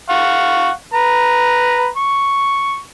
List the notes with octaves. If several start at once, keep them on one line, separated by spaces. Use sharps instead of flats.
F5 F#5 C#6
B4 A#5
C#6